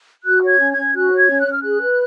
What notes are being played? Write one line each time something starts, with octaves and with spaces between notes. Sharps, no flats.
F#4 F#6
C#5 G#6
C#4
G#6
C#4
F#4 F#6
C#5
G#6
C#4
F#6
C#4
F6
G#4 F#6
B4